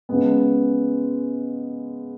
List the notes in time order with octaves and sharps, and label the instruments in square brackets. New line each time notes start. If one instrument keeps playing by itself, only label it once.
[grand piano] C#3 G#3 B3